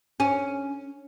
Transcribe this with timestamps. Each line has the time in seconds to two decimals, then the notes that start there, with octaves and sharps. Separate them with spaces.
0.20 C#4